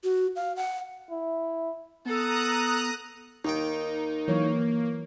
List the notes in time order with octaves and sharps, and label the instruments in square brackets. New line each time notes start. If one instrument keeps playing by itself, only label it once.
[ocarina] F#4
F5
F#5
[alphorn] E4
[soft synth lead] B3 [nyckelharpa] A4 [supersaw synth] A#5 D#6 F#6
[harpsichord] D#2 D#3 G5 [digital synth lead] D#4
[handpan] E3 F#3 C#5 [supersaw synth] A#3